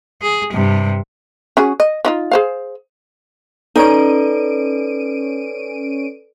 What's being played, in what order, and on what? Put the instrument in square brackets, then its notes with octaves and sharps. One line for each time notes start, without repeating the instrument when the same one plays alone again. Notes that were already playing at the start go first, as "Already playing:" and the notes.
[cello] G#4
G2 C3
[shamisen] C#4 F#4 G#4
D#5
F3 D#4 F4
G#4 C5 F5
[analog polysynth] C#4 D7 D#7 [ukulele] D#4 [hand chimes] A4 B4 D5